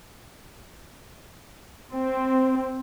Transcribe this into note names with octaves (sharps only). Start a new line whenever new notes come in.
C4